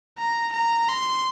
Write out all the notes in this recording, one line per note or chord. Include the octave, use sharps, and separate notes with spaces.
A#5
A#5
C6